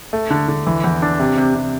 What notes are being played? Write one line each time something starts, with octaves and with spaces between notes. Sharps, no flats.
A3
D3
D3
E3
E2
D4
C3
C3
C3